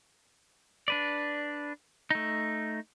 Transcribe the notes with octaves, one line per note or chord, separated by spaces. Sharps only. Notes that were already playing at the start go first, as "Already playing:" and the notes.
D4 B4 D5
A3 D#4